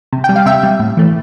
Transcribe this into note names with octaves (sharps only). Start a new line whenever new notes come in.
C3
G3 G5
F5
C3 E5 G5
G3
A2
E3 A3